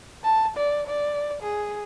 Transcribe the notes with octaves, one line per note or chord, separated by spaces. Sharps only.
A5
D5
D5
G#4